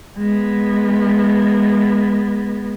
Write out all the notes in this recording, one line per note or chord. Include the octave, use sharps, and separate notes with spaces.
G#3 B3